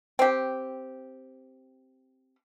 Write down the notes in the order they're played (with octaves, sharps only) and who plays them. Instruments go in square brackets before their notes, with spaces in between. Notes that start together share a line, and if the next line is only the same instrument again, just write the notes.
[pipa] C4 G4